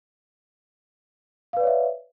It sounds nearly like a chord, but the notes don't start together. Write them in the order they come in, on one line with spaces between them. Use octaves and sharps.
F5 B4 D5 C#5 E5